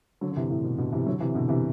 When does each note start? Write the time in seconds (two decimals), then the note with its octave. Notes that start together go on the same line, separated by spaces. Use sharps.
0.21 D3 F#3
0.31 D3
0.36 C3 E3
0.50 A2
0.64 B2
0.78 B2 D3
0.92 C3 E3
1.06 D3 F#3
1.20 C3 E3
1.35 B2 D3
1.48 C3 E3